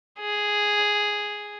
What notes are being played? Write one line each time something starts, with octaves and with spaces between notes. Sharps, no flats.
G#4